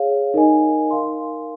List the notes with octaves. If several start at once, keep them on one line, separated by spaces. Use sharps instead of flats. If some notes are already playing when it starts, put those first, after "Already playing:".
Already playing: G#4 C#5 F5
D#4 A#4 D#5 G#5
A#4 F5 C6